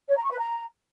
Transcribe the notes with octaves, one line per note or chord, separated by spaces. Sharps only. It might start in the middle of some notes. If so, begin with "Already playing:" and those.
C#5
A#5
C#6
B4
A#5